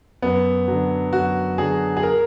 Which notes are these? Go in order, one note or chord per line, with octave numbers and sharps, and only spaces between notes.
F#2 B3
D3 F#3
F#2 F#4
D3 F#3 G#4
G#4
A#4